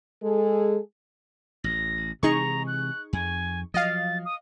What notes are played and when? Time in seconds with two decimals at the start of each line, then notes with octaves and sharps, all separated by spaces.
0.23 G#3 G#4 A4
1.64 A1 A#6
2.23 C3 E3 G#3 D#4 G#4 A#5 C#6
2.67 F#6
3.13 F2 G#5
3.74 F3 F#3 D#5 F5 A6
4.25 D#6